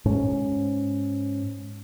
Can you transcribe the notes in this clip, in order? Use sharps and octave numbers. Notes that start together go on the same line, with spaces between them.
G#2 C#4